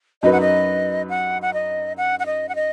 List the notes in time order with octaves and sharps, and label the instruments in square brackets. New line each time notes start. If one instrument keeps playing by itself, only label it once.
[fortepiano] F#2 F#3 D#4 B4 [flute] D#5
[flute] F#5
D#5
F#5
F#5
D#5
F#5
F#5
D#5
F#5
D#5